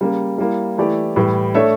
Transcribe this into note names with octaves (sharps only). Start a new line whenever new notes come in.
C#3 G3 A#3
G3 A#3 E4
E3 A3 E4 G4 D5
A2 E3 G3
A3 D4 A4 C#5 E5